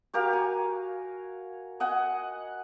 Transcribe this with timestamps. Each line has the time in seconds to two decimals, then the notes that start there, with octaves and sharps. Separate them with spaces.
0.14 F#4 G4 A#4 F5
0.33 G#5
1.80 D#5 F#5 G#5